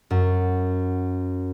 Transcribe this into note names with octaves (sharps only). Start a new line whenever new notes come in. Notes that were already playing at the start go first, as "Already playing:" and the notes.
F#2